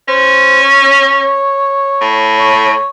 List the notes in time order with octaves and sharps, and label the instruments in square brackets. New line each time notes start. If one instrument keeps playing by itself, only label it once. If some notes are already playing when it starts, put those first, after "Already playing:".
[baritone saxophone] C#4 [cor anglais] C5
[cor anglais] C#5
[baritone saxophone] A2
[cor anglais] C#5